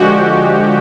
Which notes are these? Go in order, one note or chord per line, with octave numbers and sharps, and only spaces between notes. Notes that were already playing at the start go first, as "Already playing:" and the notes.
Already playing: D3 F3 G#3 F#4 G4